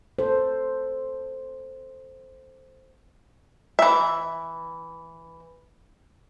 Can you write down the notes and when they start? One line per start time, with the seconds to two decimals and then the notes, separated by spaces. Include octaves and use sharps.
0.19 A4 C5
3.79 E3 E5